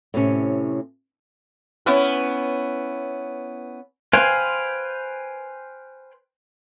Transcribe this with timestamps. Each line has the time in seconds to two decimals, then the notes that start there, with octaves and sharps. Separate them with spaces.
0.14 A2 C3 C#4
1.86 B3 C#4 E4
4.13 B4 C5 F5 G5 G#5